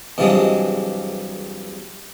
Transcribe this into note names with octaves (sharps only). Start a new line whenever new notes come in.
E2 G2 C3 F3 F#3 G#3